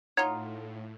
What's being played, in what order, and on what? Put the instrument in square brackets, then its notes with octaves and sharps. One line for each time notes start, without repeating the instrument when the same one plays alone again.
[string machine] A2 [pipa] D#4 F4 [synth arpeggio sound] C#5 [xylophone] F#5 A#5